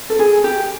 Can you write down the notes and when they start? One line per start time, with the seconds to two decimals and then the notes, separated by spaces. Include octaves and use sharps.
0.10 A4
0.19 G#4
0.44 G4